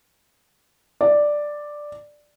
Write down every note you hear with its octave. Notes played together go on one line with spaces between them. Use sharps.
D5